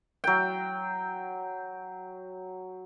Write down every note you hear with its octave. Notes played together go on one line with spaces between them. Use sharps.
F#3 G5